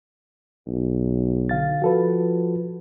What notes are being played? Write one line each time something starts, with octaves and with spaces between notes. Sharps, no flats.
B1
D3 F5 A6
F3 F#4 A4 B4